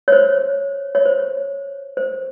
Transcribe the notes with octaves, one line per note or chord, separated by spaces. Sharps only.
C#5
C5
C#5
C5
C5